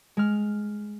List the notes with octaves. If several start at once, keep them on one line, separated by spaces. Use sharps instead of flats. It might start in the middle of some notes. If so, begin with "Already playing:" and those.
G#3 F6